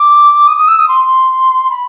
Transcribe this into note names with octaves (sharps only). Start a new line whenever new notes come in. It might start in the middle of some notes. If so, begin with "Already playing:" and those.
Already playing: D6
D#6
D#6
E6
D#6
C6
B5